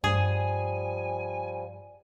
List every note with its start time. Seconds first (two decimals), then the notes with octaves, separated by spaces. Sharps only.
0.04 G2 F3 G3 G#4 G#5